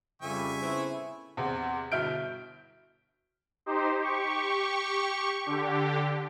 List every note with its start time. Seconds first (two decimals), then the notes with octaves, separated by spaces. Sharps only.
0.22 F2 C#3 G3 E5 G#5 C#6
0.61 A2 B3 C4 E4
1.37 E2 C3
1.92 G1 B2 E4 F6 G6 D7
3.66 D#4 G4 C5
4.00 G4 C#6
5.46 D3 G4